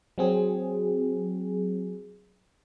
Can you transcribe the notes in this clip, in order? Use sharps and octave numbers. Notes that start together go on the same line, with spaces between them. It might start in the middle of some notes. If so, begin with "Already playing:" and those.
F#3 C4 G#4